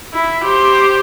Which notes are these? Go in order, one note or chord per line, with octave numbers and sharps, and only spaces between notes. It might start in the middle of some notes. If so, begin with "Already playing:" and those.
E4
G4 C5